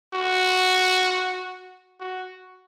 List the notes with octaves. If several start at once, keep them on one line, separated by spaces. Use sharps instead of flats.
F#4
F#4